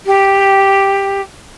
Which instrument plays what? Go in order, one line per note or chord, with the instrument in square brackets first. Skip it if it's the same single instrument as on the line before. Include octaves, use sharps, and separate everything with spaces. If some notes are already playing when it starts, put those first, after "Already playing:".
[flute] G4